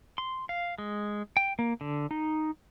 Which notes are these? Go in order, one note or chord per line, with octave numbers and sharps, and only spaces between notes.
C6
F5
G#3
G5
A#3
D3
D#4